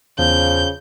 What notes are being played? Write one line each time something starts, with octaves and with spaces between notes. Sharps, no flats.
E2 C#3 F3 G6